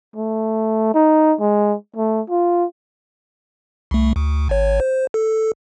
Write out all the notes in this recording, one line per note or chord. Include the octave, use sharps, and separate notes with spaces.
A3
D#4
G#3
A3
F4
C2 A3
D2
G#1 C#5
C5
A4